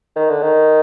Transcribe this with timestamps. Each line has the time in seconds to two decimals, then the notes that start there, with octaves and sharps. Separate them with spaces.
0.16 D#3
0.29 D3
0.42 D#3